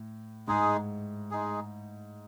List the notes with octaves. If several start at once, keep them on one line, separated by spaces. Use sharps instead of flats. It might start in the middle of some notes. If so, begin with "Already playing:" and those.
Already playing: A2
G#2 G#3 D#4 G#4
G#3 D#4 G#4